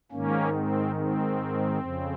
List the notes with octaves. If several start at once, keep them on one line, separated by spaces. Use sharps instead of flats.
G#2 D#3 A#3 C#4
C4
C4
F2 C#3